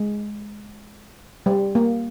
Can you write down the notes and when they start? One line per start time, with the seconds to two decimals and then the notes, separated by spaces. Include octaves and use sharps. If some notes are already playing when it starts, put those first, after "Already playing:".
Already playing: G#3
1.46 G3
1.75 A#3